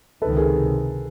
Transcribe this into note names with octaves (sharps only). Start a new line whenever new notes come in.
C#2 C3 D#3 A4 B4
G#4 A#4